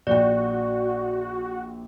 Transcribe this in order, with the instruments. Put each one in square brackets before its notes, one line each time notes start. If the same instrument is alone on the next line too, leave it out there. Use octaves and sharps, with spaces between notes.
[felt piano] A#1 G5 [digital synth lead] F#4 [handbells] D5